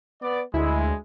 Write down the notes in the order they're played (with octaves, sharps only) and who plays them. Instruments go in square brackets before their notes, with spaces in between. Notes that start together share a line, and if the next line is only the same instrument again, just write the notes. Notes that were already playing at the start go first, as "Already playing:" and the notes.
[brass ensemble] B3 D5
[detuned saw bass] D2 [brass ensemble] G#3 [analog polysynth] E4